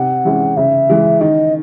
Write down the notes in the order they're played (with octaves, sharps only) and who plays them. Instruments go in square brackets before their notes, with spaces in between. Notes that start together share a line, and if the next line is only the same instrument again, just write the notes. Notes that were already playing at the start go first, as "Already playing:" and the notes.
Already playing: [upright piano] C3 [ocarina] F#5
[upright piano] E3 G#3 C#4 E4
[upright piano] C#3 [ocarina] E5
[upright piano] E3 G#3
[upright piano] D#3 [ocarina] D#5